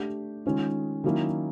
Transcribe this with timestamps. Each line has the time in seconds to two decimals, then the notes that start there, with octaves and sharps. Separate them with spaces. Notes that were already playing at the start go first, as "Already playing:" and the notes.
Already playing: A3 D4 G4
0.46 D#3 G#3 C#4 F4
1.04 D#3 F#3 A#3 C#4 E4